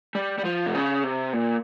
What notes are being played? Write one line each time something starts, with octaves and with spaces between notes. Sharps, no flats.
G3
G3
F3
C3
C#3
C3
A#2